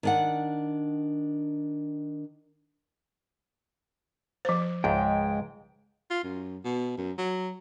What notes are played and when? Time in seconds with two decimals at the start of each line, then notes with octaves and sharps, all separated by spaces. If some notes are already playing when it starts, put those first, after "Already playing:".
0.03 D#3 D4 F#5
4.45 F3 C5
4.84 C#2 G#2 G#3 G5
6.10 F4
6.23 F#2
6.65 B2
6.98 F#2
7.18 F#3